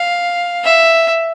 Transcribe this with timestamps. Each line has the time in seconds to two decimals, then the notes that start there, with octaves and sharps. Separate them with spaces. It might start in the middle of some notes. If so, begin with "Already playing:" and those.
Already playing: F5
0.64 E5